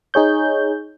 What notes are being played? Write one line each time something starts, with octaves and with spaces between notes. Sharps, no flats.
D#4 G#4 C#5 G6